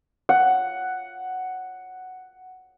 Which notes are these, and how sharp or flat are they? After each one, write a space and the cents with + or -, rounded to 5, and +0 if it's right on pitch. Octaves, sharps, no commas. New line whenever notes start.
F#5 +5